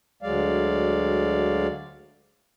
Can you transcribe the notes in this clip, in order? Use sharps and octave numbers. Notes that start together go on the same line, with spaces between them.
D2 F#3 G#3 D5 F5